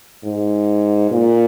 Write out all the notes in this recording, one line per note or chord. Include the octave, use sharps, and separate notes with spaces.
G#2
A#2